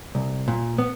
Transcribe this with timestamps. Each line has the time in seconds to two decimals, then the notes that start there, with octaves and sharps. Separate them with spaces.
0.15 C2
0.48 A#2
0.78 B3